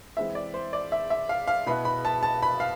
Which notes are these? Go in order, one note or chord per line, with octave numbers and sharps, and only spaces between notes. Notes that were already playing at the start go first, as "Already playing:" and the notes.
E3 G#3 C4 E4 E5
D5
C5
D5
E5
E5
F5
F5
B2 B3 E4 B5
B5
A5
A5
B5
F5